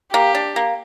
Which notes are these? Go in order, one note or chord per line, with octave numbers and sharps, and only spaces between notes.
A#3 G4
D4
A#3